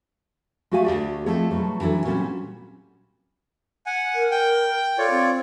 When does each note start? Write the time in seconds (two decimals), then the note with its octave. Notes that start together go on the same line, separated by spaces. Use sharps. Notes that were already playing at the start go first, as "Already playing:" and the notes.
0.71 G#3 A3 F#4 G4 F5 G#5
0.85 D2 G4 D5
1.26 F3 A3 C4 D#4 G#4 C#5
1.50 B2 F#3 G3 A3
1.81 E3 F#3 D4 A4 C#5
2.05 A#2 F#3 G3 C4 C#4
3.86 F#5 G#5
4.15 A#4
4.31 G5
4.98 F4 A4 C#5 D5
5.11 C4